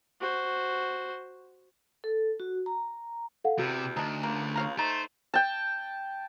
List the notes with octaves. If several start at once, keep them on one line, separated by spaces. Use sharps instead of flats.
F#4 C5
A4
F#4
A#5
A4 F5 F#5
E2 C3 F#4
D2 D4 D#4
C#2 A#3
C#5 F5 A#5
A3 D#4 C5
G5 A5